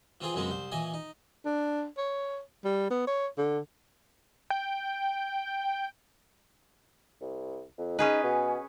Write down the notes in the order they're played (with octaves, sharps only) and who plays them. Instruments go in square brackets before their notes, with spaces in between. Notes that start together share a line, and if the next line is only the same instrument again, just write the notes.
[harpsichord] E3 C4 F4 G#4
F#2 C#3 F#3 G#3 B3 C4
C2 C5
A#2 E3 D#5 G#5
D#4
[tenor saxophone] D4
C#5
G3
B3
C#5
D3
[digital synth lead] G5
[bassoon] C2
F2
[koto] C#4 G#4 B4 [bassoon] D#4
[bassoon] B2